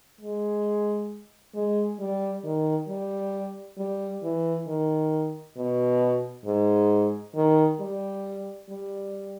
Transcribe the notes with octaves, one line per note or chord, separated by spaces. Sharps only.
G#3
G#3
G3
D#3
G3
G3
E3
D#3
B2
G#2
D#3
G3
G3